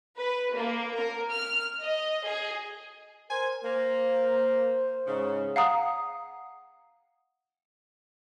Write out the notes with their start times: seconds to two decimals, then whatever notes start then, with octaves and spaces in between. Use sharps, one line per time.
0.19 B4
0.55 A#3
0.96 A#4
1.31 F6
1.83 D#5
2.27 G#4
3.30 A#4 C5 G#5
3.64 A#3 C5
5.07 G#2 C#3
5.56 F5 F#5 A#5 D#6